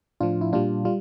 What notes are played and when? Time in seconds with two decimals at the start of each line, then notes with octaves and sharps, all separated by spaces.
0.20 A2 F3 D4 F4
0.41 E4
0.53 A#2 G3 D4 F4
0.85 G3 F4